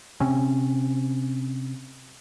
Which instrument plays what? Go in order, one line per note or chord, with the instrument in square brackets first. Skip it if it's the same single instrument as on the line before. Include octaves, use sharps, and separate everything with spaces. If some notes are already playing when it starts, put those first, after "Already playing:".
[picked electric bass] C3 C4 C#4